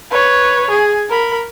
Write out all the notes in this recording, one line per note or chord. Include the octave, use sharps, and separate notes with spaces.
B4 C#5
G#4
A#4 B5